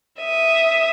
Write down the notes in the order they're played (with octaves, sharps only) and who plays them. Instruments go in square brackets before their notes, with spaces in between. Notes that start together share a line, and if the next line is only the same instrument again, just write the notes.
[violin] E5 D#6